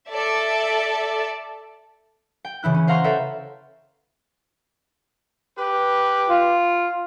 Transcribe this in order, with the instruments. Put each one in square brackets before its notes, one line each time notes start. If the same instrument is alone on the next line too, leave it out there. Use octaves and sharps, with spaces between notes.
[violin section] A4 D5 E5
[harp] G5
C#3 E3 E4 F#6
C#4
C5 F5 F#5 A#5 C6 C#6
A4 B4 C#5 E5 G5
[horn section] G4 B4
[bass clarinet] F4